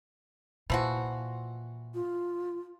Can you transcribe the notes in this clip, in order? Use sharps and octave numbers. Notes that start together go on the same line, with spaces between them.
A#2 E3 F3 F#4
F4